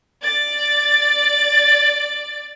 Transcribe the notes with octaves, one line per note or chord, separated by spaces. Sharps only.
D5 A6